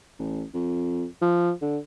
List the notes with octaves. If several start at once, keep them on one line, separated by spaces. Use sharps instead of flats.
A1
F2
F3
D3